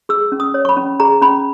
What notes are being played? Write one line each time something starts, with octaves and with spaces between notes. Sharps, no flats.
G#4 E6
C#4
D#6
C#5
C#6
B5
C#4
G#4 A#5
C#4 B5